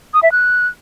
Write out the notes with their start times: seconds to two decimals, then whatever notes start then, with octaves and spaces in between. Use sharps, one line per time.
0.14 D#6
0.23 E5
0.32 F#6